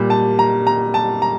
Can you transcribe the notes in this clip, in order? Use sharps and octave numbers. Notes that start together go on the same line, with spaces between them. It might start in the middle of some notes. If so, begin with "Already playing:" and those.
Already playing: A#2 G3
A5
A#5
A#5
A5
A#5